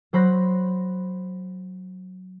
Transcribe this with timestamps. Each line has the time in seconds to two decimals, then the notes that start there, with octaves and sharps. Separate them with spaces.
0.13 F#3 C5 B5 F#6 A#6